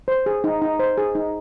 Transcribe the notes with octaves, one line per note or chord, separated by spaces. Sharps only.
C5
G#4
D#4
D#4
C5
G#4
D#4